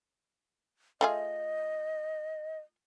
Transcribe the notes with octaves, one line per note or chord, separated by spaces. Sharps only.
A3 F4 G#4 D#5